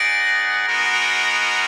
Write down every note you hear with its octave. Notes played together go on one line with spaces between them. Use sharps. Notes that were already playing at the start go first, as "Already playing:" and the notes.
Already playing: D#4 G#4 D5 F#5 A#6 D7
G#3 B3 D#4 F#4 A#4